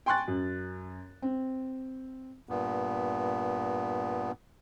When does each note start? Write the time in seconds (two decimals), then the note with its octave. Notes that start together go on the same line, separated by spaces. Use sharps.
0.06 G5 G#5 C6 C#6 F#6 A6
0.28 F#2
1.22 C4
2.49 G2 A#2 B3